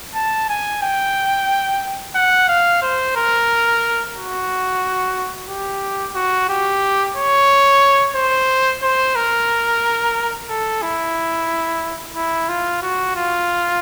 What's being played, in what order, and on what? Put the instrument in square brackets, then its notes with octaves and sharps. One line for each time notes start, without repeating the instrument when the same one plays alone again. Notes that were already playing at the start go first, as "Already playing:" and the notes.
[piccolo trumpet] A5
G#5
G5
F#5
F5
C5
A#4
F#4
G4
F#4
G4
C#5
C5
C5
A#4
A4
E4
E4
F4
F#4
F4